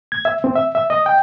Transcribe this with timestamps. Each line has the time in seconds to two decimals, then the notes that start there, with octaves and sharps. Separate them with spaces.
0.12 G#6
0.25 E5
0.44 C4
0.55 E5
0.75 E5
0.90 D#5
1.06 G5